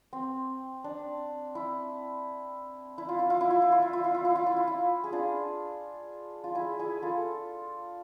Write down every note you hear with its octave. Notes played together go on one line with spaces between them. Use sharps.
C4
D4
E4
E4
F4
E4
F4
E4
F4
E4
F4
E4
F4
E4
F4
E4
F4
E4
F4
E4
G#4
D4 F4
F4
E4 G#4
E4 G#4
F4 A4